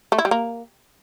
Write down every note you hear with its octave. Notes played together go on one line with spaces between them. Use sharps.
A3
E4
G3
A#3